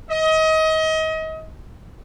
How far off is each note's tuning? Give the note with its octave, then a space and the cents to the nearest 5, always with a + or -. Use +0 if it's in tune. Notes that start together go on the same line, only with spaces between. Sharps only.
D#5 +30